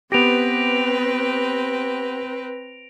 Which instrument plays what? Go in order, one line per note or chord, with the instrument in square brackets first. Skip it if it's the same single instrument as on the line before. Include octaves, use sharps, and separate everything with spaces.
[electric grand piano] B3 G4 [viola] C4 B4 [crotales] A#6 D7 F7